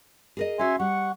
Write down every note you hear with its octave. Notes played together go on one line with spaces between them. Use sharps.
G#4 A#4 D#5
C#4 F#4 E5 G#5 C6
G3 F#5 C#6